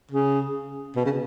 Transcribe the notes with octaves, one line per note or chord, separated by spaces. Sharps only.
C#3
B2
C#3